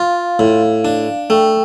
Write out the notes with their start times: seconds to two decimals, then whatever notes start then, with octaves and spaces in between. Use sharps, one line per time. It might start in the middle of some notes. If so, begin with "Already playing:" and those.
Already playing: F4 F5
0.39 A2
0.85 D4
1.30 A3 G5